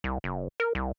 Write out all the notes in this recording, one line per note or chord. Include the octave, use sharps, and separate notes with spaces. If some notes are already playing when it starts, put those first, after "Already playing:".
C2
F#1
A#4
C2